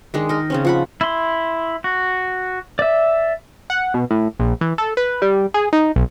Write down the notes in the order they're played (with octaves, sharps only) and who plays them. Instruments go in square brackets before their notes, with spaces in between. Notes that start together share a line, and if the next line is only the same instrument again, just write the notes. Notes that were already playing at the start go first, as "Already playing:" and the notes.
[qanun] D#3 G#3 D4
D#4 A#4
C#3 C4 C#4
F3 F#5 B5
[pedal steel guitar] E4 C6
F#4
D5 E5
[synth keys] F#5
B2
A2
A#1
E3
A4
B4
G3
G#4
D#4
B1